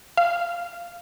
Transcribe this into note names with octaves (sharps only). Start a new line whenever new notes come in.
F5